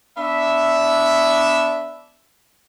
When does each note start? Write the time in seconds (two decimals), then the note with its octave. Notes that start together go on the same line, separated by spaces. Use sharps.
0.17 B3 D4 E5